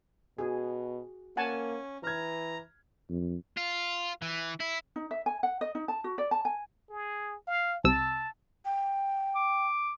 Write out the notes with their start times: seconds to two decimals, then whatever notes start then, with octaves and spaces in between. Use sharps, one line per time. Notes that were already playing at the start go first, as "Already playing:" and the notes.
0.38 B2 F#4 G#4
1.37 A#3 C#4 F#5 G#5 A5
2.03 E3 A#5 F6 G#6
3.09 F2
3.57 F4
4.22 E3
4.61 E4
4.96 D#4
5.11 E5
5.26 G#5
5.43 F#5
5.61 D#5
5.75 D#4
5.88 A5
6.04 F#4
6.18 D5
6.31 A5
6.45 G#5
6.90 G#4
7.48 F5
7.84 C2 C3 A5 E6
8.65 G5
9.35 D6